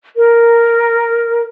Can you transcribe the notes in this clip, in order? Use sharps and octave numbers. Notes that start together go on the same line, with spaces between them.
A#4